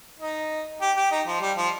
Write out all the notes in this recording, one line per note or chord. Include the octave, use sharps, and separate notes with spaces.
D#4
G4
G4
D#4
F3
G3
F3